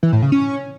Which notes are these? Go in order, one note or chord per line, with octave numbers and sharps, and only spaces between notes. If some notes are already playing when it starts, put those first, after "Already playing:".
E3
A2
C#3
C#4